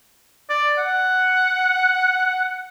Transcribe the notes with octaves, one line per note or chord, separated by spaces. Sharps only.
D5
F#5